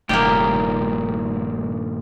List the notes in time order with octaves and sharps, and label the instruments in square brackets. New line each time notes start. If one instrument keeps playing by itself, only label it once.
[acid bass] F1 [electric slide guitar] G2 A#2 D#3 [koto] A#3 G4